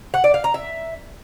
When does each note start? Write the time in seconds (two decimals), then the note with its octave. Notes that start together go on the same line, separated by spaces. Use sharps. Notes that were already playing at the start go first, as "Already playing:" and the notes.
0.14 F#5
0.24 D5
0.34 F5
0.44 A#5
0.54 E5